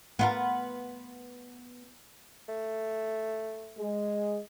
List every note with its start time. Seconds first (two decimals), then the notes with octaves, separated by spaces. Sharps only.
0.19 B3 F4 A#4
2.48 A3
3.78 G#3